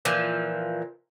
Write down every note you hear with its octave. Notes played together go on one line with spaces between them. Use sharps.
A#2 E3 F3